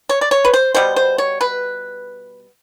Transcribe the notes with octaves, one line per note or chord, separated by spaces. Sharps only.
C#5
D5
C#5
B4
C5
B2 G3 B3 C5
C5
C#5
B4